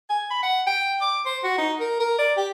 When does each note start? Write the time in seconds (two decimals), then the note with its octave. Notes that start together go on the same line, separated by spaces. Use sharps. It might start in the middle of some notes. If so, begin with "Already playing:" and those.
0.09 G#5
0.30 B5
0.43 F#5
0.67 G5
1.01 D6
1.26 C5
1.44 F#4
1.58 D#4
1.80 A#4
2.00 A#4
2.19 D5
2.37 G4